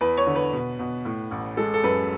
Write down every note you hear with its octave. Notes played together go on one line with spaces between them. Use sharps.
E2 B4
C#5
D3
B4
B2
B2
A2
A1
G#3 A4
A4
F#2 B4